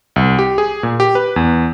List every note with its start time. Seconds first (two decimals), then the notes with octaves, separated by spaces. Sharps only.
0.16 C2
0.39 G4
0.58 G#4
0.83 A#2
1.00 G4
1.15 B4
1.36 E2